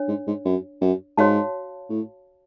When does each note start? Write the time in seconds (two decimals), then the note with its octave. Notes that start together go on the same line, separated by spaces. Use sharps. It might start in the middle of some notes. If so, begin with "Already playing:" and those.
Already playing: D4 C#5
0.08 G#2
0.27 G#2
0.45 F#2
0.81 F#2
1.17 G#2 F#4 C#5 F5 A5
1.90 A2